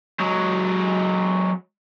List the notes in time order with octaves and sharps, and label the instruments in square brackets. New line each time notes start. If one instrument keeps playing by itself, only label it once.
[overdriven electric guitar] F#3 G#3